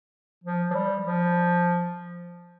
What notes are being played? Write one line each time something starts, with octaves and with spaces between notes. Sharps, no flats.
F3
F3
G3
F3